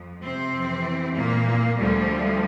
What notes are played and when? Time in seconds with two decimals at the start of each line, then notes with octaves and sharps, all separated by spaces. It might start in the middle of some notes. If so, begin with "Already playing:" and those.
Already playing: F2 F3
0.22 C3 C4
0.53 F2 E3
1.15 A#2 A#3
1.77 D2 D3 F3 G3